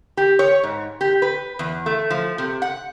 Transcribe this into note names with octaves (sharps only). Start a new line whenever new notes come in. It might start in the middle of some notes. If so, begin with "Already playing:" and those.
G4
C#5
G#2
G4
B4
E2
A3
F3
C3
F#5